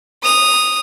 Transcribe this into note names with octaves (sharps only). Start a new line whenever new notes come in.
D#6 F7